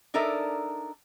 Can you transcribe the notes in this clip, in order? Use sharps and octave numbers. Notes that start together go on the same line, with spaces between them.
D4 D#4 A4 A#4 D5 E5